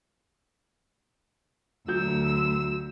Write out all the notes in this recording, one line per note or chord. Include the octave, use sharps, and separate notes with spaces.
D2 F#3 E6 G6